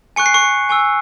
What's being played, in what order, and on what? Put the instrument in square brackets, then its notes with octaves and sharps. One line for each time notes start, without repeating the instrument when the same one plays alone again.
[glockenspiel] G#5 C#6 F#6 C#7
C7
C#6 C#7
G#5 C#6 E6